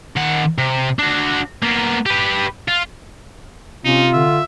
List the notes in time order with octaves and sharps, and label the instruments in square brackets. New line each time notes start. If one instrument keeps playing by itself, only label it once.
[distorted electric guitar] D#3 F#5
C3
D4 F#4
A#3 B3
G4 B4
F4
[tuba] C3 [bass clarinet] C#4 [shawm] D#4 [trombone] F4
[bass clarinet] D3 [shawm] E5